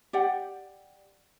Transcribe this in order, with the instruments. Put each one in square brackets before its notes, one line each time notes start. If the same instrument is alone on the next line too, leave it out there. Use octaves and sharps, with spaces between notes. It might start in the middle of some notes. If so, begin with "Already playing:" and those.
[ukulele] G4 D5 F#5 G5